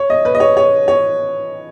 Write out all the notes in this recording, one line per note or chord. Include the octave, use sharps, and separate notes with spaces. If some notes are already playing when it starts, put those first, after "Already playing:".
Already playing: C#5
D#5
B4
D#5
C#5
C#5
C#5